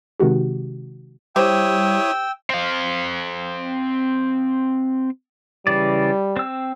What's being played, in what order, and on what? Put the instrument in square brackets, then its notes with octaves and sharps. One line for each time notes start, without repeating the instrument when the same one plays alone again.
[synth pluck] C3 D#3 G#3 F#4 G4
[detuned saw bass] G3 [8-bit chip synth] E4 C#5 D#6 [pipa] G4 C5 [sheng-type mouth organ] G5 E6
[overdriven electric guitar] C4 F5
[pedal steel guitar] C#3 E3 D5 [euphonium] G3
[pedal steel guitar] C4 E6